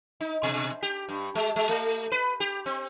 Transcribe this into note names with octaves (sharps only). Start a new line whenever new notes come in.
D#4
B2
G4
G2
G#3
G#3
A3
B4
G4
C4